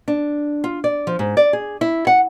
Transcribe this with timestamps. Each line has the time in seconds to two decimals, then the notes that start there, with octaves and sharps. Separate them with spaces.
0.08 D4
0.64 F4
0.84 D5
1.07 F3
1.19 G#2
1.37 D5
1.53 G#4
1.81 E4
2.07 F#5